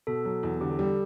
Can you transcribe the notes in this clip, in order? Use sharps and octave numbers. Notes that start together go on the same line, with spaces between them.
B2 A4
F#3
E2
D3 G4
A4
G3 G4